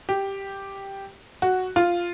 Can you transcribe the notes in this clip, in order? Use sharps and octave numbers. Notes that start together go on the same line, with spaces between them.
G4
F#4
F4